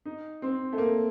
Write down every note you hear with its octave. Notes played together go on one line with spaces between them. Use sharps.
D#4
C4
A3
A#3